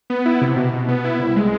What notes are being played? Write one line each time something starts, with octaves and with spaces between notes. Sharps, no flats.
B3
E4
C3
B2
B2
B3
E4
C2
G#3